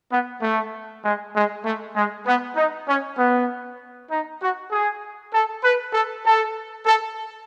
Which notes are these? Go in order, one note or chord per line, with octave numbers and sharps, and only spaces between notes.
B3
A3
G#3
G#3
A3
G#3
B3
D#4
C#4
B3
D#4
F#4
G#4
A4
B4
A4
A4
A4